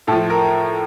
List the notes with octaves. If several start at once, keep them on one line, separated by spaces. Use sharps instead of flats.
A2 F3 A4
A#4